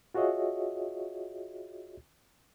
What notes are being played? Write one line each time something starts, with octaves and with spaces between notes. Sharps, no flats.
F4 F#4 G#4 C#5 D#5 E5